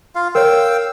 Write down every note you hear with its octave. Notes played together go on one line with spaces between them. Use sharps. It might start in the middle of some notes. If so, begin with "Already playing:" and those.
F4 F5
A#4 C#5 F5 G5 E6